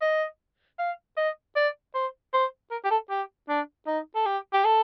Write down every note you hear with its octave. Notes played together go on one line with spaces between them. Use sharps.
D#5
F5
D#5
D5
C5
C5
A#4
G4
A4
G4
D4
D#4
A4
G4
G4
A4